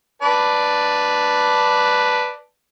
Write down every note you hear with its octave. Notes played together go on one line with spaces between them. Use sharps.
B4 D5 A5